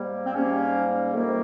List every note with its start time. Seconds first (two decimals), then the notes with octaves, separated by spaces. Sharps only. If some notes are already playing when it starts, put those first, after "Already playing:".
Already playing: G#2 G3 A#3
0.25 C4
0.34 G#2 G3 A#3 C#4
1.14 F2 C3 D#3 G3 A#3